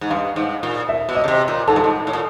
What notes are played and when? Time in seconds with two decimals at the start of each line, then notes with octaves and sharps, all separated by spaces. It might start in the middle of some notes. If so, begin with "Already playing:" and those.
0.01 G#2
0.10 G2 F5
0.36 G#2
0.63 A#2
0.89 E5
1.09 B2
1.15 D#5
1.24 C#3
1.28 C3
1.48 A#2
1.68 G#2 A4
1.76 G2
1.84 G#2
2.07 A2
2.13 A#2